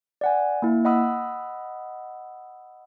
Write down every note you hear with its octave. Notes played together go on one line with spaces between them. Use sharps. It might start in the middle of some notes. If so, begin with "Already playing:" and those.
D5 F#5 G#5
A#3 E4
D#5 F#5 B5 D#6 E6